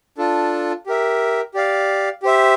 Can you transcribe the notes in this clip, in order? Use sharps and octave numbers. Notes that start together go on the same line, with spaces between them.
D4 F4 A4
G4 A#4 E5
G4 D5 F5
G4 C5 E5